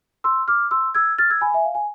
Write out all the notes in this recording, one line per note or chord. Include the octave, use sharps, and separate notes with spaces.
C6 E6
D6 F6
C6 E6
E6 G#6
F6 A6
E6 G#6
G#5 B5
E5 G#5
F5
G#5